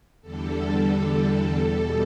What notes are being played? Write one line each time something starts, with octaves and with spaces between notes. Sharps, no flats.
E2 D3 G3 A4
E2 B2 G3